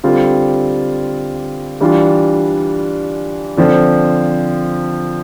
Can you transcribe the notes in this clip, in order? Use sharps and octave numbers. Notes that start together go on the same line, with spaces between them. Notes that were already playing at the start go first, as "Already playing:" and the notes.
D3 G3 C4 F4
E3 G3 D4 F4
D3 F3 C4